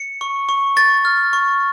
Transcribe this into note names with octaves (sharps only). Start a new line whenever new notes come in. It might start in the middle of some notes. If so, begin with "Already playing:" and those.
Already playing: C#7
C#6
C#6
C#6 A6
F6
C#6